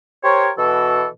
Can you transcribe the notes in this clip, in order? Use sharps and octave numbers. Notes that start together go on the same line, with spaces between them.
G4 A#4 C5 C#5
B2 E3 F#4 A4